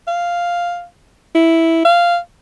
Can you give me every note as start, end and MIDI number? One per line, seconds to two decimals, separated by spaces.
0.08 0.85 77
1.35 1.83 64
1.85 2.18 77